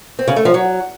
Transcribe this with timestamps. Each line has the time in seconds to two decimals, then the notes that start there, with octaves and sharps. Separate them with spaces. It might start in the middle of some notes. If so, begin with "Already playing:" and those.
0.19 C4
0.28 C#3
0.36 A3
0.45 F3
0.54 F#3